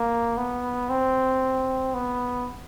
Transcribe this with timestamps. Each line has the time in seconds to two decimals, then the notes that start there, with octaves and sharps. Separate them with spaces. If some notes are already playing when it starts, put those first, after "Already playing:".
Already playing: A#3
0.37 B3
0.89 C4
1.94 B3